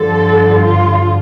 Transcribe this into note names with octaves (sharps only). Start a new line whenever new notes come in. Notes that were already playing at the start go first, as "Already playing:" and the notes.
Already playing: G2 D3 F3 A4
F4